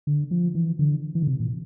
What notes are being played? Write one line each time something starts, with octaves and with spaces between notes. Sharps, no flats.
D3
F3
E3
D3
E3
D3
C3
A#2